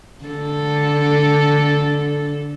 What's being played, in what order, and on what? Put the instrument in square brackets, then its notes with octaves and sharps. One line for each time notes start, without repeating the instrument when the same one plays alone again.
[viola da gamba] D3 A4